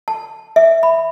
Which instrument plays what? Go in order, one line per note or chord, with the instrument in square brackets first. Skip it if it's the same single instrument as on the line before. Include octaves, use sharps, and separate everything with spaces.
[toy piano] A5
E5
B5